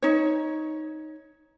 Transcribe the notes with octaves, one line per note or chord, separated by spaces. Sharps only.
D#4 C#5